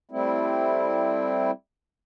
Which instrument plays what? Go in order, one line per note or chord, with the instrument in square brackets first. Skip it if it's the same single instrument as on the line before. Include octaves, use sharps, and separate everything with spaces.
[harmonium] G3 A3 C4 E4